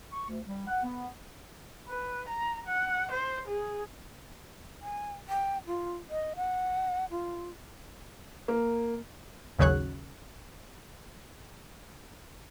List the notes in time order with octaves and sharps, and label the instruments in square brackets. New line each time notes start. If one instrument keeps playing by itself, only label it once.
[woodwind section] C#6
D2
G3
F#5
B3
[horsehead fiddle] B4
A#5
F#5
C5
G#4
[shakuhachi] G#5
G5
F4
D#5
F#5
F4
[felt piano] A#3
[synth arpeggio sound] A1 D#2 C#3 F#3 C#5 F#6